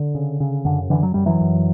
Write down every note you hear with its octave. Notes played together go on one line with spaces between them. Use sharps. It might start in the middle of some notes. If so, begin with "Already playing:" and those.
Already playing: D3
C#3
C#3
F#2 D3
F#2 D3 E3
F#3
F#2 G3
E3 F#3
F#2